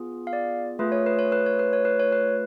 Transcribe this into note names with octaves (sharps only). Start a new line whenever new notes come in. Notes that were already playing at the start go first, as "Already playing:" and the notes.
Already playing: B3 F4 G#4
F5
D5
A3 F4 G#4 B4
C#5
B4
C#5
B4
C#5
B4
C#5
B4
C#5
B4